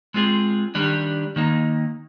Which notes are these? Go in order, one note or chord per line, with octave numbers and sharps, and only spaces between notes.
G#3 C4 F4 G#4
D#3 G3 D4
D#3 A#3 D#4